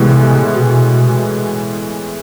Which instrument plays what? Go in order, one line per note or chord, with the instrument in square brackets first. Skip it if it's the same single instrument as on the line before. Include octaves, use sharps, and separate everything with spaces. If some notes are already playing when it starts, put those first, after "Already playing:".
Already playing: [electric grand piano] A2 E3 G#3 B3 [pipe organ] C3
[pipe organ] B2